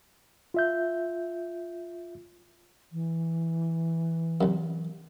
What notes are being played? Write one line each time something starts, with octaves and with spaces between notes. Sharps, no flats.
F4 E5 G6
E3
C2 F#2